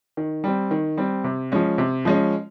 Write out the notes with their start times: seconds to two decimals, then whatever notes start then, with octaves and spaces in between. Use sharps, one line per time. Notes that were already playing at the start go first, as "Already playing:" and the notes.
0.17 D#3
0.44 G3 C4
0.71 D#3
0.97 G3 C4
1.24 C3
1.52 F3 G#3 C#4
1.78 C3
2.05 F3 G#3 C#4